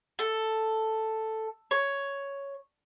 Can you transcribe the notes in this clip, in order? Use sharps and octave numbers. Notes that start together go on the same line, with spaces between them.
A4
C#5